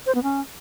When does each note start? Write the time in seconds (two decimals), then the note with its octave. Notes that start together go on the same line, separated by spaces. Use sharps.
0.06 C5
0.15 B3
0.23 C#4